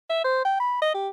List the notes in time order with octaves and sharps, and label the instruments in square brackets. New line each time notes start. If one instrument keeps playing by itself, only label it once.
[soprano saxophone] E5
C5
G5
B5
D#5
G4